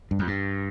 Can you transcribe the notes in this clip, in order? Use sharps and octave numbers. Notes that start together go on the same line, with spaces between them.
G2
F2
G2